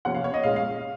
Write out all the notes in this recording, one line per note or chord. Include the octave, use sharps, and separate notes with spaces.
C3 F3 A#3 C#4 F#5
F5
C#5
D#5
A#2 G#3 C#4 F5
F5